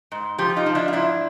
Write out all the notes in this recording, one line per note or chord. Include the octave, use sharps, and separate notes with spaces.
G#2
F3 F4 G4
D#4 F4
F3
D4 E4
F4
G#2 D4 E4